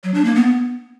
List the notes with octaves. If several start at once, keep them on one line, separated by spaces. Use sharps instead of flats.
F#3
D4
A#3
B3